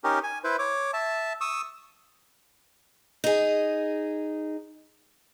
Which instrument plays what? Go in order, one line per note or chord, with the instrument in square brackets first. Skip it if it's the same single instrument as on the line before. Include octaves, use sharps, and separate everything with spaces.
[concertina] C#4 D#4 G4 A#4
G#5
E4 B4 C5
C#5 D6
E5 A5
C#6 D#6 E6
[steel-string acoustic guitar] D#4 G#4